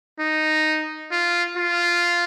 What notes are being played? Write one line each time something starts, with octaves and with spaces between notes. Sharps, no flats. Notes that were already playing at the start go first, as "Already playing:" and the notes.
D#4
F4
F4